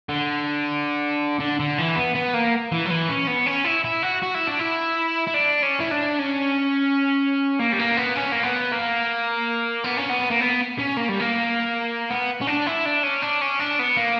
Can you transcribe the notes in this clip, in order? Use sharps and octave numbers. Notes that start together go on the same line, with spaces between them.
D3
D3
D3
E3
B3
B3
A#3
E3
F#3
E3
C#4
B3
C#4
E4
E4
F#4
F#4
E4
D4
E4
E4
D4
C#4
E4
D4
C#4
A#3
G3
A#3
B3
C#4
A#3
B3
A#3
B3
C#4
B3
A#3
B3
C#4
A#3
G3
A#3
B3
C#4
D4
E4
D4
C#4
D4
C#4
D4
B3
A#3